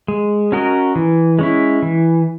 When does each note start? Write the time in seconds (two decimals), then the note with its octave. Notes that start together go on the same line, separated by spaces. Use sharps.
0.08 G#3
0.52 C#4 F#4 A#4 D#5
0.96 E3
1.39 G#3 C#4 E4
1.82 E3